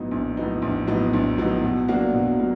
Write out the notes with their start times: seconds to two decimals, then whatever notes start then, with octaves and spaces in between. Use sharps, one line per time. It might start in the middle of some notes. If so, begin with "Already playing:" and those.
Already playing: A#1 A2 F#3 B3 D#4
0.11 A#1
0.37 A2 F#3 B3 D#4
0.62 A#1
0.87 A2 F#3 B3 D#4
1.13 A#1
1.38 A2 F#3 B3 D#4
1.64 B2
1.88 F#3 A#3 D4 F#4
2.14 B2
2.39 F#3 A#3